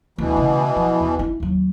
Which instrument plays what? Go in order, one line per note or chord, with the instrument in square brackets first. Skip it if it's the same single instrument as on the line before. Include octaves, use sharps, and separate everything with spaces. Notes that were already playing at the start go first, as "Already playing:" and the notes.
[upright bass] G1 D2 [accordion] B2 E3
[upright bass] C#3 A3
F3
E2
E4
D#2 F#3